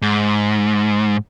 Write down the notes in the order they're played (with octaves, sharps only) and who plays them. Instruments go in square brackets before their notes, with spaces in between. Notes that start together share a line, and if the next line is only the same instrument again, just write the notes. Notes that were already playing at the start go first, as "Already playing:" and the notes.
[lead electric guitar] G#2